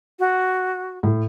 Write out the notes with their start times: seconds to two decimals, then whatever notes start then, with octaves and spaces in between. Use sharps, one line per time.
0.19 F#4
1.03 A2